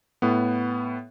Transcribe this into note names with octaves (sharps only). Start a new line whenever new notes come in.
A2 B3